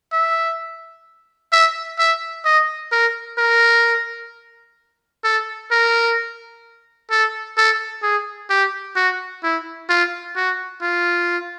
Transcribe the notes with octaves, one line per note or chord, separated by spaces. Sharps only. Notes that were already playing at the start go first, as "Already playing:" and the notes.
E5
E5
E5
D#5
A#4
A#4
A4
A#4
A4
A4
G#4
G4
F#4
E4
F4
F#4
F4